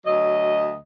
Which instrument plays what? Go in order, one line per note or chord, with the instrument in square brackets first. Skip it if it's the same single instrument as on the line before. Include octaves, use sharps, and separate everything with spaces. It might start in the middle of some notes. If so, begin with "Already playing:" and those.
[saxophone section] D2 F#3 D#5